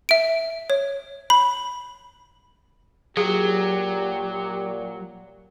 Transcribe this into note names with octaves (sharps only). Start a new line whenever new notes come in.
E5 D7
C#5
B5
A#2 F#3 G4 G#4